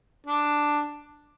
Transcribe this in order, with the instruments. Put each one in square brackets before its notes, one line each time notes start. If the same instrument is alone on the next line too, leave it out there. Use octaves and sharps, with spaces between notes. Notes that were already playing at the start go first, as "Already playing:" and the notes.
[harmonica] D4